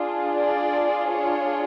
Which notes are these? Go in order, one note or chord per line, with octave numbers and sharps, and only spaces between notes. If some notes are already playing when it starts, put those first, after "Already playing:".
Already playing: D4 F4 G#4
D5
C#5